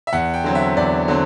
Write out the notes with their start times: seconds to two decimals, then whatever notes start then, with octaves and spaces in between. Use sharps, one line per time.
0.07 E5
0.13 E2 F#5
0.34 G5
0.44 D3 F#3 C4
0.55 E5
0.77 E2 D5
1.08 D3 F#3 C4